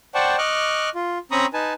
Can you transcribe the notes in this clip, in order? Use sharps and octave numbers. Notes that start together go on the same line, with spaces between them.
C5 D5 F#5 G5 A5 C#6
D#5 C#6 D6 F6 F#6
F4
C4 C#4 A#5 B5 C#6 D#6
D#4 B4 G#5 A5